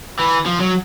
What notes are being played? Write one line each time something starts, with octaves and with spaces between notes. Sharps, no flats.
E3
F3
F#3